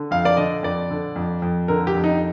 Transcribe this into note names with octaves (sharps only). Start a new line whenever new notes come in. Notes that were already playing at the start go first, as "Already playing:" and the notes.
Already playing: D3
F2 F5
D5
D3 D#5
F2 D5
D3
F2
F2
D3 A#4
G4
F2
D#4